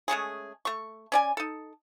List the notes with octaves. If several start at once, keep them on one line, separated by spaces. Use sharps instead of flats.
G#3 A3 C#4 G#4
A3 C#6
C#4 D5 G#5
D#4 A4